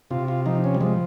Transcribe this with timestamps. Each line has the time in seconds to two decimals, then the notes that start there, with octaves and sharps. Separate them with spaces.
0.11 C3 F4
0.28 F4
0.46 F3 D#4
0.64 C#4
0.75 G3
0.80 F3 G#3